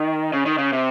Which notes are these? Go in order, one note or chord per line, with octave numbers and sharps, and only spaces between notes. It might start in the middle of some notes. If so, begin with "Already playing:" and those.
Already playing: D#3
C#3
D#3
C#3
C3